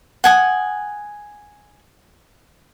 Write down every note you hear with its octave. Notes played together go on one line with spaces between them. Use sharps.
F#5 G#5 D#6